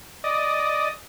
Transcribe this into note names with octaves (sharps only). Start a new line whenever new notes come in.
D5 D#5